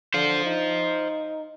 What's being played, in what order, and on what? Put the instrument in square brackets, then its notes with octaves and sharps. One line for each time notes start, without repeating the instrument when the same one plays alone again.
[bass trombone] D3 [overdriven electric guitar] C5 F5
[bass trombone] D#4